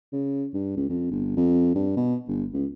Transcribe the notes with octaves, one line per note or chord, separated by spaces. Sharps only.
C#3
G2
C#2
F2
G1
F2
G2
B2
G1
C#2